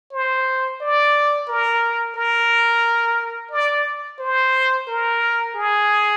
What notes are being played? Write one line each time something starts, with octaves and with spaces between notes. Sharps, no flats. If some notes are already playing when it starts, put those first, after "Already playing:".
C5
D5
A#4
A#4
D5
C5
A#4
G#4